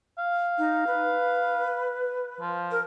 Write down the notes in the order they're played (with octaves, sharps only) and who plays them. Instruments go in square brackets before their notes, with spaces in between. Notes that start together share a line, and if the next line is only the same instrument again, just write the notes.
[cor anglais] F5
[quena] D#4
B4
[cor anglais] F3
[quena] A#4